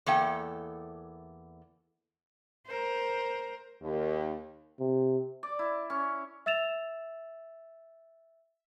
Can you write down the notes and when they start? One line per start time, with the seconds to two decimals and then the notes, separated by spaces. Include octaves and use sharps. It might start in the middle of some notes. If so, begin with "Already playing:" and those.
0.06 E2 A#3 A4 G5
2.67 A#4 C5
3.82 D#2
4.80 C3
5.43 D5
5.59 E4
5.90 C#4
6.46 E5 E6 A6 E7 F7